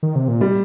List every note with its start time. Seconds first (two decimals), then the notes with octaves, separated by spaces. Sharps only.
0.03 D#3
0.16 C3
0.28 A#2
0.41 G3